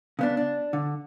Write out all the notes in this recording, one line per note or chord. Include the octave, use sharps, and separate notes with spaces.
C#3 B3 D4
D4
D3